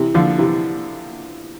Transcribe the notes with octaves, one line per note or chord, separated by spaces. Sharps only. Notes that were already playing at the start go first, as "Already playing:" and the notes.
Already playing: C3 E3
D3 F3
C3 E3